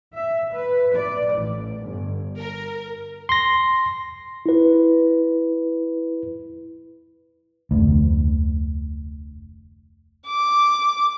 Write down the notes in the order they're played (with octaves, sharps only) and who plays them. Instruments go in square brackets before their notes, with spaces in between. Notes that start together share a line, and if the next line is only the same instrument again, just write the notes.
[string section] E5
B4
D5
A1
G1
A#4
[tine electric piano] C6 A#6
E4 B4
[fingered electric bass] F1 D2
[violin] D6